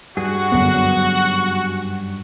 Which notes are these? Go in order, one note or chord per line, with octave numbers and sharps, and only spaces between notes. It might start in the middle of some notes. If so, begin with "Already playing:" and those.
G2 F#4 G#4
F#2 D3 B3